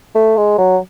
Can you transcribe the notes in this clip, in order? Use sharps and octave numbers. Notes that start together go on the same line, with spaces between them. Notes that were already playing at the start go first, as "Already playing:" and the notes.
A3
G#3
F#3